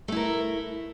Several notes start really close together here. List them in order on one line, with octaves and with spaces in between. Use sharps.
A3 E4 A#4